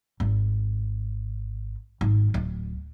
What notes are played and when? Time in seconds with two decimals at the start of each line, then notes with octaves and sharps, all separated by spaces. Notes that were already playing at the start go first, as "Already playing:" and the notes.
0.20 G#1
2.01 G#1
2.34 D1